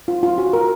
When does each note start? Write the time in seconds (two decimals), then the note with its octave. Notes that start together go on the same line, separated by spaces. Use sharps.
0.08 F4
0.23 F4
0.38 F#4
0.53 A#4